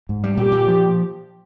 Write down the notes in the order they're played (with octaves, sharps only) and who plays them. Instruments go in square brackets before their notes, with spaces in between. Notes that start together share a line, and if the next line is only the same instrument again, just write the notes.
[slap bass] G#2
G3
[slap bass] A#2 [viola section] G4
[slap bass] A#2
F3